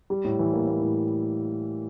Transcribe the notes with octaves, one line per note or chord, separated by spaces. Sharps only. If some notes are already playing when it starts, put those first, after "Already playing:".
G3
A2
E3
A#3
A#3
A2